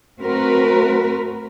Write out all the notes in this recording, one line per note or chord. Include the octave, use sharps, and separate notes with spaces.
A3 C4 F#4 A#4 B4